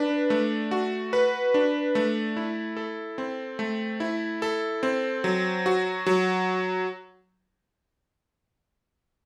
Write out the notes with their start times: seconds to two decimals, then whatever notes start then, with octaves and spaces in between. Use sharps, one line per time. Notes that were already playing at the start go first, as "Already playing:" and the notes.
Already playing: D4 B4
0.30 A3
0.71 F#4
1.13 B4
1.54 D4
1.95 A3
2.37 E4
2.77 A4
3.18 C4
3.59 A3
4.00 E4
4.42 A4
4.83 C4
5.24 F#3
5.66 F#4
6.06 F#3